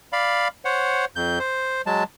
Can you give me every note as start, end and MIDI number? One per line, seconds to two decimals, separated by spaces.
0.13 0.48 74
0.13 0.48 77
0.13 0.48 83
0.65 1.05 72
0.65 1.05 73
0.65 1.05 78
1.16 1.39 41
1.16 1.39 91
1.39 1.82 72
1.86 2.04 54
1.86 2.04 56
1.86 2.04 81